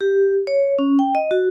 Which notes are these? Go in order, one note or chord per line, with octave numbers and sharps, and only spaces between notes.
G4
C#5
C#4
G5
D#5
F#4